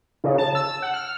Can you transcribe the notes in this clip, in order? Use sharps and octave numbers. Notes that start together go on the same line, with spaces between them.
C#3
A5
E6
F#5
F6